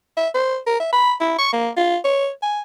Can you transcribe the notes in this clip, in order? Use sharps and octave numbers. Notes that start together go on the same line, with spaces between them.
E5
C5
A#4
E5
B5
E4
C#6
A#3
F4
C#5
G#5